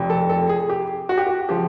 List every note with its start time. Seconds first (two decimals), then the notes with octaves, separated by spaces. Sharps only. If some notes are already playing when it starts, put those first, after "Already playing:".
Already playing: F1 F2 C3
0.10 A4
0.30 A4
0.49 G#4
0.70 G4
1.09 F#4
1.18 G4
1.27 F#4
1.49 C#3 F3 G#3 G4